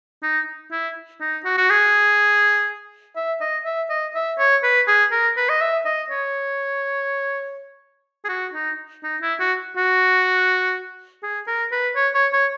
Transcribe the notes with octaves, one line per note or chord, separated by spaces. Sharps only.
D#4
E4
D#4
F#4
F#4
G#4
E5
D#5
E5
D#5
E5
C#5
B4
G#4
A#4
B4
D#5
E5
D#5
C#5
G#4
F#4
D#4
D#4
E4
F#4
F#4
G#4
A#4
B4
C#5
C#5
C#5